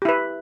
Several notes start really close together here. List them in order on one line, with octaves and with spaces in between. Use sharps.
G4 E4 B4